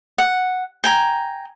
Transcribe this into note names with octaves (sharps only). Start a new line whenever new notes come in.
F#5
G5 G#5 A#5